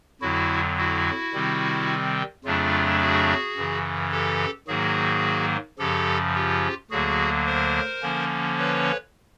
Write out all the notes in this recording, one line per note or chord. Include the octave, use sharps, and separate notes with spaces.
F2 D3 F#3 E4 F#4
E4 F#4
C3 D#3 G3 C4
F2 C#3 F#3 A3 D4 F4
F#4 G#4
F#2 C#3 E3
G4 A4
G#2 D#3 F#3 A#3 F#4 G#4
F#2 C#3 F3 G4 A4
F4 G4
D2 D3 F#3 A#3 F#4 G#4
A#4 C5
D3 F3 A#3 C#4
B4 C#5